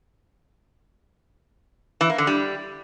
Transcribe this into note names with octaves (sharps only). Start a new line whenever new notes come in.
E3
A#3
D3
G3